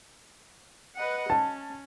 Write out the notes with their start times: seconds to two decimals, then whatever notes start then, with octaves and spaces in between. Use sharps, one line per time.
0.96 B4 D#5 F#5
1.30 C#4 A5